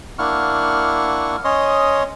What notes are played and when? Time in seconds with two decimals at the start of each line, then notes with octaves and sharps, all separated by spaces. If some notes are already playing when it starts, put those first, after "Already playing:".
0.19 A#3 D4 E4 F#5 C#6 F6
1.44 C#4 C#5 D#5 C6 D#6